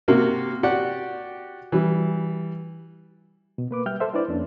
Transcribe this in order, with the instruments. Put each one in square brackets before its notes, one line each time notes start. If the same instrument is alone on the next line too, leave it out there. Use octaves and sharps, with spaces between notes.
[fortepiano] C3 A#3 F#4 A#4
F#4 G4 D5 F#5
E3 G3
[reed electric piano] B2
A#3 B4 D6
G3 E5 G5 F6 G6
A4 C5 E5
D4 E4 B4 C5 D5
F2 A#3 C#4 D4